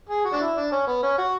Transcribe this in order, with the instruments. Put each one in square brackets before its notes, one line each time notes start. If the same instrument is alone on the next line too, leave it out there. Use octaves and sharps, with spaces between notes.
[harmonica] G#4
F#4
D4
E4
D4
C#4
B3
C#4
F#4